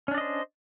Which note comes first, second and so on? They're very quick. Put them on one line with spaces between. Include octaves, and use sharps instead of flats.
C#4 D4 D5 D#5 C5